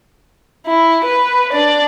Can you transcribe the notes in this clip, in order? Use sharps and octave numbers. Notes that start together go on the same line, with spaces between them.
E4
B4
D4 D5